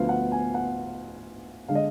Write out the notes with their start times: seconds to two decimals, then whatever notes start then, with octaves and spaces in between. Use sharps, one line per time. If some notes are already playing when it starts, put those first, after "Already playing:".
Already playing: D2 D3 F3 B3 F5
0.09 F#5
0.32 G#5
0.54 F#5
1.68 D3 G#3 F5
1.75 D#5